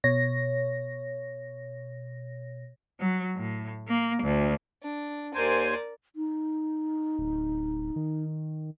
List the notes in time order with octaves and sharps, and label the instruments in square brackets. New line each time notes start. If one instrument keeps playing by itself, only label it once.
[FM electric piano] B2 C#5 A#6
[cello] F#3
A2
A#3
D2
[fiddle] D4
[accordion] D#2 C5 G#5 [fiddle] A#4 D5
[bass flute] D#4
[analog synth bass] D1
D#3